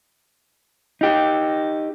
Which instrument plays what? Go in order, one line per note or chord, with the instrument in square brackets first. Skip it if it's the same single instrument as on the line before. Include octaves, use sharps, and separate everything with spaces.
[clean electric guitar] D#4 G4